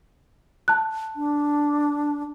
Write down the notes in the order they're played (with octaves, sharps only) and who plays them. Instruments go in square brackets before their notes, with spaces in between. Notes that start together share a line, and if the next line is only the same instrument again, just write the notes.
[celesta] A5 F#6
[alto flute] D4